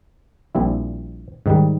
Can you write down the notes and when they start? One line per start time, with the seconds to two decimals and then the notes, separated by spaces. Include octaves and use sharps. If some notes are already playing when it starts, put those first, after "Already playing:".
0.55 A#1 A#2 G3 C4 E4
1.46 G#2 D#3 G3